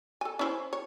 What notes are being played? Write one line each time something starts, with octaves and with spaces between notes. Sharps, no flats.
A4 G#5
C#4 E4 C5
C#5